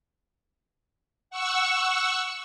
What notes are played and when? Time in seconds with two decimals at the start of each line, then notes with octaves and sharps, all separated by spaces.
1.30 F#5 C#6 E6